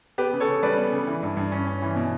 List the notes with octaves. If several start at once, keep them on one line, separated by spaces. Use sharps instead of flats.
B3 G4 B4
C#3
A4 C#5
C#3
G3 B4 D5
B3
C#3
E3
G2
G2
C#4
C#4
E3
B2